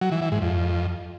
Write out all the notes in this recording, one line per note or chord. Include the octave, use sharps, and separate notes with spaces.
F#3
E3
E3
G#2
F2